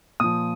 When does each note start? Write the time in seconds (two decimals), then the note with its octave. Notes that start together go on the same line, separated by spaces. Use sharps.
0.20 A#2 F3 D#6